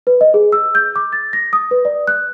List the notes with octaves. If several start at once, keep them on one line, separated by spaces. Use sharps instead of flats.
B4
D#5
G#4
E6
G6
D6
A6
A#6
D#6
B4
D5
F#6